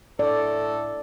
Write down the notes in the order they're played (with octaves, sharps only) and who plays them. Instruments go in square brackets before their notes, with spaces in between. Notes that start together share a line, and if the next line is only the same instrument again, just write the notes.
[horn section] A2 A4 [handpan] D5